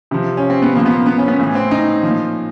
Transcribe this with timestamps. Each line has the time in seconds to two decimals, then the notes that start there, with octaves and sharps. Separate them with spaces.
0.11 C3 F3
0.37 C#4
0.50 C4
0.62 B3
0.75 A#2 F3 A#3
0.86 B3
0.91 A#3
1.07 B3
1.18 C#4
1.28 B3
1.39 A2 E3
1.55 C4
1.71 D#4
2.03 A#2 F3